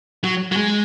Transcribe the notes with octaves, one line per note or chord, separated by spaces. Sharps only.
F#3
F#3
G#3